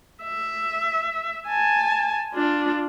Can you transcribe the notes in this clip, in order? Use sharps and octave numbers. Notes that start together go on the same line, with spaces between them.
E5
G#5 A5
D4 F4